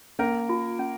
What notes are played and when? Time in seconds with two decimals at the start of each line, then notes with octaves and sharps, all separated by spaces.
0.19 A#3 C#4 A#4
0.49 F4
0.79 C#4